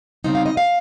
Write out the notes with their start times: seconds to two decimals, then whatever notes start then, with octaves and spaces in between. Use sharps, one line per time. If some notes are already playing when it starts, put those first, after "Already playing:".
0.24 C#3 G3 C4 D#4
0.35 F5
0.46 D#5
0.57 F5